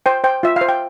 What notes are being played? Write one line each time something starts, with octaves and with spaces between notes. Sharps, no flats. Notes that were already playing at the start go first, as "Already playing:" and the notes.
C5 G5
C5 G5
F4 E5
C5 F5
G5